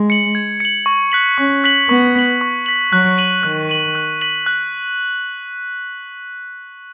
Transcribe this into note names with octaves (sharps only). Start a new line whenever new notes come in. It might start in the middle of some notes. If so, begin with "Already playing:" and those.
Already playing: G#3
C#7 F#7
G#6
C#7 F#7
C#6
F#6 B6 F#7
C#4 C#6
F#6 B6 F#7
B3 C#6
B6 F#7
C#6
B6 F#7
F#3 F#6
D#7 F#7
D#3 F#6
D#7 F#7
F#6
B6 D#7 F#7
F#6